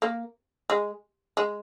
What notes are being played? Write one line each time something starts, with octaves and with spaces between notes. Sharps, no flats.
A#3
G#3
G#3